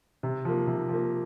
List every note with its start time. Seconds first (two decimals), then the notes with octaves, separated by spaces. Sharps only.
0.23 C3
0.45 F3 A#3
0.67 C3
0.89 F3 A#3